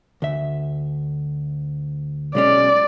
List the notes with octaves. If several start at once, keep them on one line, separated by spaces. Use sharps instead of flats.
D2 E5
B1 G#3 C#4 D5